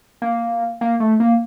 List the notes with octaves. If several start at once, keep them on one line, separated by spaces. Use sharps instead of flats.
A#3
A#3
A3
A#3